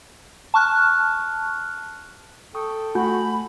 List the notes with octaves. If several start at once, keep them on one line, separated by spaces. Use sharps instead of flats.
A5 C#6 F6 F#6
A4 G5 C#6 D#6
A3 F#4 G#5 B5 G6